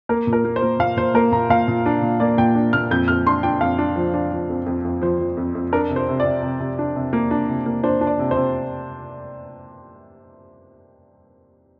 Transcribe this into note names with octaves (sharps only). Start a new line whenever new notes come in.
A#3 A#4
A#2
A#4
A#3
C5
A#3
A#2 F5
A#2 C5
A#3 A#4
A#2 A#5
A#2 F5
A#2
D4
A#2
A#3 D5
A#2 G5
D4
A#2 F6
F2 G6
F2 F6
D4 C6
D4 G5
F2 F5
D4
F3
D4
F3
F2
F2
F2
F3 C5
F3
F2
F2
D4 A#4
C3
C5
C3
D5
C3
C3
C3
D4
C3
A#3
D4
C3
A#3
D4 C5
D4
D5
C3
C5
C3